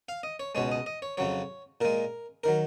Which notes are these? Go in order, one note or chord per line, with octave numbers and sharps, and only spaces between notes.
F5
D#5
C#5
C#2 B2 G#3 C#5
D#5
D#5
C#5
F2 C#3 F#3 C#5
A#2 G#3 A#4
D#3 F#3 A#4